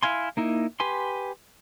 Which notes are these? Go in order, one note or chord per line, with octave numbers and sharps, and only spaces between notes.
E4 F5 G#5 C6
A#3 D#4 E4
G4 B4 G#5 C6